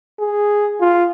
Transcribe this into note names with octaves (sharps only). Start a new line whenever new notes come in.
G#4
F4